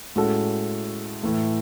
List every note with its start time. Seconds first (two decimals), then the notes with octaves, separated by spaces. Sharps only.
0.16 A2 G#3 C#4 F#4 A4
1.23 A2 E3 A3